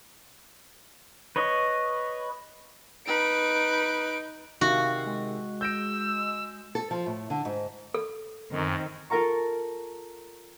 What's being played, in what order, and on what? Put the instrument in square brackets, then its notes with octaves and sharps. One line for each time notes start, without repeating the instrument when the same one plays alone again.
[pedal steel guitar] B4 C#5 D#5
[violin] D#4 D7 [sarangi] B4
[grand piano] C3 D#3 [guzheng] F#4 [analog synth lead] F5
[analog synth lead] G#3
[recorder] E6 [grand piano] G6 A#6 D7
[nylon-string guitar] A4
F3
A2
D3
G#2
[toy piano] A4
[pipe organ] F#2 [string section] D#3 C4
[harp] F4 A4 A#4 F5 A#5 C#6